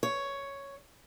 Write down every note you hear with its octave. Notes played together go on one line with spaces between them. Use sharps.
C#5